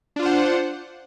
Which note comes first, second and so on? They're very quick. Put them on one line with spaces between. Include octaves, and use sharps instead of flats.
D4 F4 C5 F#5